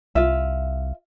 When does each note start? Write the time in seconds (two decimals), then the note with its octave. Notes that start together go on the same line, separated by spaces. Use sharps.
0.15 C2 F4 E5